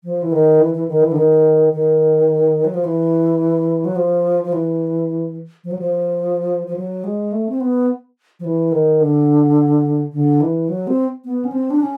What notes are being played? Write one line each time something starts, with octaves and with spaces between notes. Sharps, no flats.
F3
E3
D#3
E3
E3
D#3
E3
D3
D#3
D#3
F#3
F3
E3
F#3
F3
F3
E3
F3
F#3
F3
F3
F#3
G#3
A3
C4
B3
F3
E3
D#3
D3
D3
E3
F#3
C4
B3
C#4
C4
D4
C#4